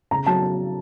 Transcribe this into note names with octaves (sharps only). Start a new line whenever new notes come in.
C#3 A#5
F#3 A5